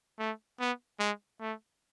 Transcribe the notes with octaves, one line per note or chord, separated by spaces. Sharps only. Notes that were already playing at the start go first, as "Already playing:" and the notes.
A3
B3
G#3
A3